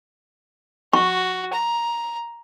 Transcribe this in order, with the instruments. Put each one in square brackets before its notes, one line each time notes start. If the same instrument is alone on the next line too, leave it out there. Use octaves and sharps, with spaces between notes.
[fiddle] F#4 [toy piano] C#6
[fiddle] A#5